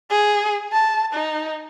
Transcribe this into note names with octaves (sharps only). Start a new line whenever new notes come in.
G#4
A5
D#4